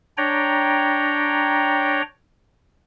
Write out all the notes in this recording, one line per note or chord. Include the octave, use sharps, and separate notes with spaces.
D4 C#5 G5 A#5